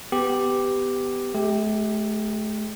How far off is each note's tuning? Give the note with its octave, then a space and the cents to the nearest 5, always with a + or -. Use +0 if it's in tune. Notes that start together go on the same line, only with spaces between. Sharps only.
B3 +15 G4 +0
A3 -40 G4 +10